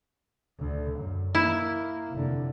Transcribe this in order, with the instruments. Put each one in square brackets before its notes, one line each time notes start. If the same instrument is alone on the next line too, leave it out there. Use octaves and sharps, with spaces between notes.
[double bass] D2 D3
F#2
[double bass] A#3 [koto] E4
[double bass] F1 D3